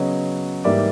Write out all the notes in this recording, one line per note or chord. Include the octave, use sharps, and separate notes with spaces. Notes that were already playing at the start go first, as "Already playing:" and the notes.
Already playing: C#3 F#3 B3 C#5 D#5
G#2 E3 G3 A#3 D5 E5